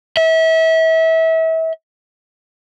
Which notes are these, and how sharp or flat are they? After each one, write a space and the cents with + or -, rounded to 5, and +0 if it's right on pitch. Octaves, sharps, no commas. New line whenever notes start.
E5 -30